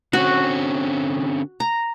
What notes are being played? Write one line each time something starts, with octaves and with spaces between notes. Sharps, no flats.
D3 C4 C#4 F#4
A#5